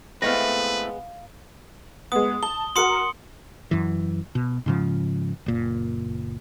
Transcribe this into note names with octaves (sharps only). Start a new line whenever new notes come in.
A2 G#3 A3 B3 C4 B4 F5 A#6
G#3 B3 D#6
A5 G7
F#4 A#4 F#5 C6 D#6 C#7
F#2 E3
B2
G#2 C#3 F3
F#1 A#2